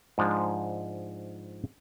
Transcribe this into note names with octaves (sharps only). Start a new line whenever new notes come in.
G#2 F3 G#3 D4